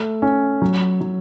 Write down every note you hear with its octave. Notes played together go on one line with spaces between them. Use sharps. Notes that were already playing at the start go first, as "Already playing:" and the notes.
Already playing: A3
C#4
F#3
F#3